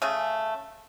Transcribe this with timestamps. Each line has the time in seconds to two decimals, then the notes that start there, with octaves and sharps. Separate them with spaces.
0.02 C#3 A3 G#4